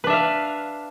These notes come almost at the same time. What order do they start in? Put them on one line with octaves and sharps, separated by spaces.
B4 D4 E5 F5